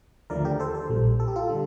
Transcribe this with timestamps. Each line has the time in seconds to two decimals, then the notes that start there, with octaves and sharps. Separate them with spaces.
0.30 D#2 D3 F3 A3 A#4 D5
0.45 G4 A#4
0.60 A4 C5
0.75 A4 C5
0.89 A#1 A#2 G3
1.20 A4
1.28 G4
1.36 F4 A4
1.49 D3 G3